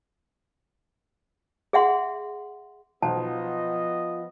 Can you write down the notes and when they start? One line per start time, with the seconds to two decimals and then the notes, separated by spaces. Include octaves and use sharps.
1.73 G#4 E5 F#5 C6
3.02 B1 F3 B3 D#5 A5